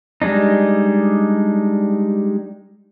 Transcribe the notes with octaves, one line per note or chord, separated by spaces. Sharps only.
G3 G#3 D4 D#4